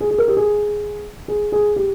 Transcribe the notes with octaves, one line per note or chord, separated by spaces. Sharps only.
G#4
G#4
A#4
G4
G#4
G#4
G#4
G4